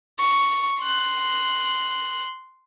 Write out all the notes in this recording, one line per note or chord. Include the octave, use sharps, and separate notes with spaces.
C#6
C6 F#6